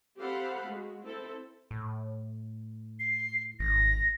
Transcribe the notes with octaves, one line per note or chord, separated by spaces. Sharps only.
C4 G4 A4 F5 F#5 B5
G#3 F#4
C4 E4 A4
A2
C7
G#1 A#6